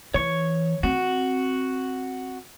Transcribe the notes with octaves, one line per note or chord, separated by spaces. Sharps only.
E3 C#5 C#6
C4 F#4